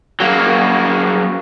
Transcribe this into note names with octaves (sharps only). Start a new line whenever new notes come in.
F#3 A#3